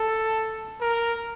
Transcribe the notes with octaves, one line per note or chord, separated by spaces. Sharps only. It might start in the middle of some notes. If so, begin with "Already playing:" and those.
Already playing: A4
A#4